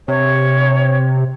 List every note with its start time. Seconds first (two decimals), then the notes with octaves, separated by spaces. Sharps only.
0.08 C3 C#5